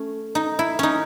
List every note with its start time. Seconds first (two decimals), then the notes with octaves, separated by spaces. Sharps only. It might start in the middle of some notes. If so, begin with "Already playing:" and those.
Already playing: A3 C#4
0.35 D#4
0.59 E4
0.79 C#4 D#4